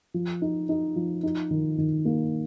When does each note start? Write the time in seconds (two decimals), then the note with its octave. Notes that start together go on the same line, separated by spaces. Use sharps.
0.14 F3
0.42 D#4
0.69 D#4
0.96 F3
1.23 D#4
1.51 D#3
1.78 D#3
2.05 A#3